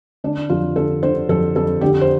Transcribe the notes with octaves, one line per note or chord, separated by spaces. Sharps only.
D3 D4
F2 F4
D3 A4
D3 C5
F2 A4
F2 A4
D3 G4
C5